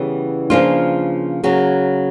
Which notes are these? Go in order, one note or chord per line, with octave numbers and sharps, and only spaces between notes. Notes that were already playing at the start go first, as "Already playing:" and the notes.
Already playing: C#3 E3 G3 B3
C#3 F3 A#3 D4 F4
C#3 F#3 A#3